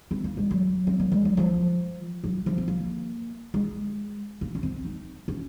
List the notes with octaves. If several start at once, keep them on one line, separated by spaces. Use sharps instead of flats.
C4
A#3
G#3
F#3
C4
A#3
G#3
F#3
F3
F#3
F3
C4
A#3
G#3
A#3
C#4
C4
D#4
C#4